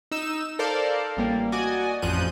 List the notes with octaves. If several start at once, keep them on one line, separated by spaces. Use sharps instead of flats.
D#4 E6 E7
A4 A#4 C5 D5 F5
A1 G3 A#3
F#4 D5 D#5 G#5
A1 F2 F3 F#6 G6 D#7